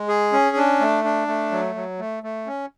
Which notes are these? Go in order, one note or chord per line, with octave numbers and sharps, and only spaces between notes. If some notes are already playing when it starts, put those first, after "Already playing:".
Already playing: G#3
G#4
C#4
D4
A3
D4
A3
F#3
F#3
A3
A3
C#4